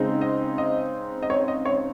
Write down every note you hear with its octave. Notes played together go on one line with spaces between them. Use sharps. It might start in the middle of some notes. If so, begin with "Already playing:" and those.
Already playing: C#3 G#3 C4 D#4
D#5
D#5
D#5
C#5
D#5
C#5